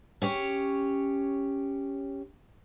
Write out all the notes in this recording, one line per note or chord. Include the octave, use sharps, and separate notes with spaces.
C#4 G4 C#5